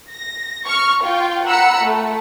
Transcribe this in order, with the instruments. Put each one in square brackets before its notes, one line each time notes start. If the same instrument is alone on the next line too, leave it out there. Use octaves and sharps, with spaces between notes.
[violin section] A#6
C#6 F6
F4 G5
F#5 A#5 B5 E6 C#7
A3